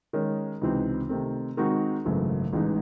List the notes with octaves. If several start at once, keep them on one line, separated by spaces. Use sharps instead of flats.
D#3 G#3 C#4
C#2 C3 E3 C4 D#4
C3 D#3 A3 C4
D#3 G#3 C4 D#4 F#4
G#1 F#2 C#3 E3 A3
A1 A2 E3 G#3 D#4